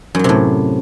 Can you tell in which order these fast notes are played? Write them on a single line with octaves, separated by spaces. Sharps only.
F#2 F#3 C3 A2